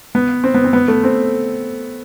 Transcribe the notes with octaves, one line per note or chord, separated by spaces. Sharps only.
B3
C4
B3
C4
B3
A3
C4